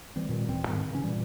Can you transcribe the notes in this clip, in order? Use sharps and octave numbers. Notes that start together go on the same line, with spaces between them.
E3 G3 C4
A#2 D#3 F3 G3
D#1 E3 G3 C4
G#2 D#3
C#3 E3 C#4
G2 A#2 E3 G3